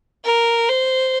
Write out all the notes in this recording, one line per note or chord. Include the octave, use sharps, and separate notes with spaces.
A#4
C5